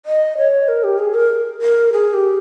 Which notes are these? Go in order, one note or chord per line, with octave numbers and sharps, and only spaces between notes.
D#5
C#5
A#4
G4
G#4
A#4
A#4
G#4
G4